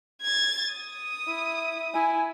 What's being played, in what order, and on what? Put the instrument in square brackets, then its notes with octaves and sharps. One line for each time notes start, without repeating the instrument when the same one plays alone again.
[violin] G#6 A6
D#6
[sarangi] E4
[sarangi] E4 [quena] G#5